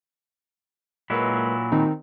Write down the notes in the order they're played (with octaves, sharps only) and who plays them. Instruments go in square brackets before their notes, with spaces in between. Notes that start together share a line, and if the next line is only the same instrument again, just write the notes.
[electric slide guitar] A#2 F#3 E4 [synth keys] G#3 A#4 B4
[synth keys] D#3 C4 D#4